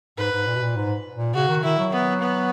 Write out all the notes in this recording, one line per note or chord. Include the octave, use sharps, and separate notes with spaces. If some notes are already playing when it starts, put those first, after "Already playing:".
G#2 B4
G#2
A#2
B2
A#2
G#2
A#2
C#3 F#4
D#3
D#3 E4
F#3
B3
B3